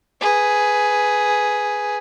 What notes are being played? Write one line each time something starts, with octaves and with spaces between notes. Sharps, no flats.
G#4 B4